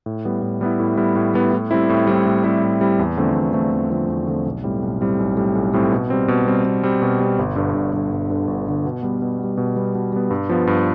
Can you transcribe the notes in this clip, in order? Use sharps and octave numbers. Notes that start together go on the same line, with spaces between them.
A2
G3 B3 E4
A2
G3 B3 E4
A2
G3 B3 E4
A2
G3 B3 E4
A2
G3 C4 E4
A2
G3 C4 E4
A2
G3 C4 E4
A2
G3 C4 E4
E2
D3 F3 A3 C4
E2
D3 F3 A3 C4
E2
D3 F3 A3 C4
E2
D3 F3 A3 C4
B1
A2 G3 C4
B1
A2 G3 C4
B1
A2 G3 C4
B1
A2 G3 C4
B2
G3 C4
B2
G3 C4
B2
G3 C4
B2
G3 C4
G1
G2 D3
G1
G2 D3
G1
G2 D3
G1
G2 D3
B2
G3 B3
B2
G3 B3
B2
G3 B3
B2
G3 B3
G2
F3 B3
G2